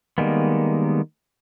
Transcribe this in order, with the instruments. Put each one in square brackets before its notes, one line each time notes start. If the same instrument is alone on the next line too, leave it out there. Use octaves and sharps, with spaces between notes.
[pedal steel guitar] D#3 G3 G#3 A#3 B3